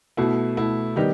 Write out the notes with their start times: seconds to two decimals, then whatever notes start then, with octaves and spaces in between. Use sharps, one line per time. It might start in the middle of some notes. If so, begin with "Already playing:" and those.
0.17 B2 A3 E4
0.57 B2 A3 E4
0.96 D#3 G3 B3 D#4 G4